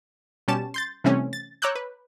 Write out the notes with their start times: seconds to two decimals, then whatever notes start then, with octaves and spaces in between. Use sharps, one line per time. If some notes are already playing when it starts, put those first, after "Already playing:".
0.48 B2 G3 C#4 G4 A5 E7
0.74 C6 G6 A6
1.04 C3 E3 G3 A3 C4 C#4
1.33 A6
1.62 C#5 A#5 D6 E6 F#6 G6
1.76 B4